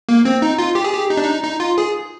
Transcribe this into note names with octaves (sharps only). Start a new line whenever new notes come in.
A#3
C4
D#4
F4
G4
G#4
G4
D#4
D4
D#4
D#4
F4
G#4